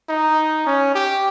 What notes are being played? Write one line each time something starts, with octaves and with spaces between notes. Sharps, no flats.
D#4
C#4
G4